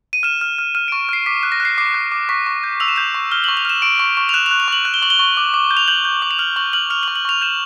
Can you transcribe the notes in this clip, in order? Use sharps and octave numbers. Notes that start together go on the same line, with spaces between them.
D#7
F6 E7
F6
F6
F6 D#7
D7
C#6
F6 C7
D6 B6
F#6
A#6
F#6
C7
D6 C7
F#6
D6
C#6 B6
C#6
G6
E6 F7
E7
G6 F7
C#6
F6 G7
F#7
C#6
F7
F6 E7
C#6 D7
C#6
C#6
F7
F#6 E7
F7
F#6
F7
C#6 F#7
F#6
G7
C#6 F#7
G7
C#6
D6
D6
G6
F7
G6 F#7
G6
D6
F7
F6 F#7
C#6 F#7
F6 F#7
F6 F7
F#7
C#6
F#7
C#6 F7
G6 E7